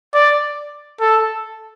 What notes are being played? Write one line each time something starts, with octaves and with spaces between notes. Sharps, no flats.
D5
A4